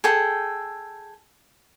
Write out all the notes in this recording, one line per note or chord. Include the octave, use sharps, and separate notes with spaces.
G#4 A4 G5